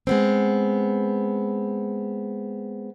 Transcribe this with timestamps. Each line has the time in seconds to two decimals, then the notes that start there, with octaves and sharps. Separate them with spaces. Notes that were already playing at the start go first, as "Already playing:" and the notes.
0.07 G#3 B3 C4